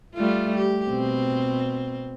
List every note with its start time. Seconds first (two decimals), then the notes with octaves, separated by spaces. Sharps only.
0.15 G3 A3 F4
0.57 G4
0.88 B2 C4